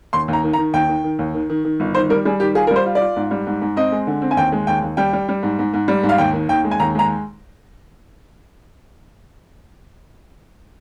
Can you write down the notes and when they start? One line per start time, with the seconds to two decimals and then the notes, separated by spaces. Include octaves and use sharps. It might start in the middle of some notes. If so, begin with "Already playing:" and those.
0.13 D#2 C6
0.28 D#2 A#5
0.44 D#3
0.53 A#5
0.58 D#3
0.73 D#2 G5
0.89 D#3
1.04 D#3
1.19 D#2
1.34 D#3
1.50 D#3
1.65 D#3
1.80 G1
1.95 D#3 C5
2.10 G3 A#4
2.25 G3 G#4
2.40 D#3 G4
2.55 F4 G#4
2.67 A#4
2.71 G3
2.76 C5
2.86 F4
2.95 D5
3.01 F4
3.16 G#2
3.31 G3
3.47 G#2
3.62 G#2
3.76 C4 D#5
3.92 G#3
4.07 D3
4.22 C4
4.31 G#5
4.37 D#2 G5
4.52 G#3
4.67 D#2 G5
4.82 D#2
4.97 G3 G5
5.13 G3
5.29 G3
5.43 G#2
5.59 G#2
5.74 G#2
5.88 G3
6.03 G#2
6.09 F5
6.18 D#2 G5
6.33 D#3
6.49 D#2 G5
6.64 G#3
6.71 G#5
6.80 D#2 A#5
6.95 G#3 A#5